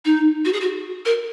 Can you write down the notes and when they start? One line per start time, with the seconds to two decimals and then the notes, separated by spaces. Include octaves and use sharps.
0.05 D#4
0.45 F#4
0.53 G#4
0.60 F#4
1.06 A#4